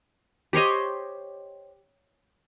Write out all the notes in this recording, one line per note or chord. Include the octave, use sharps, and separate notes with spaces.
G4 C5 C#5 D#5